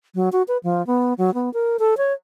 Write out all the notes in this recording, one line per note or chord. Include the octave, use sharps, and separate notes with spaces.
F#3
F#4
B4
F3
B3
F#3
B3
A#4
A4
C#5